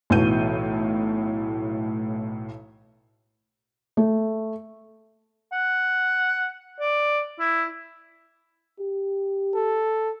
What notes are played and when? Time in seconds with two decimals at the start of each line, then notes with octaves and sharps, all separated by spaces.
0.10 B1 A2 E3 F#4 G6 D#7
3.97 A3
5.53 F#5
6.80 D5
7.39 E4
8.79 G4
9.55 A4